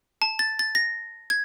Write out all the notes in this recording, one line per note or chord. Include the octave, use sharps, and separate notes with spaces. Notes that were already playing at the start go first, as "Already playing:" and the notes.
A5
A6
A6
A#6
G#6